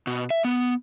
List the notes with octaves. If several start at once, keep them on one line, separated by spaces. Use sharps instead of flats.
B2
E5
B3